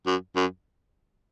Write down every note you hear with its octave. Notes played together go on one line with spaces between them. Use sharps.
F#2
F#2